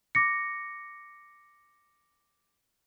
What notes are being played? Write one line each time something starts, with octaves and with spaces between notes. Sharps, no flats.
D6 A#6 C#7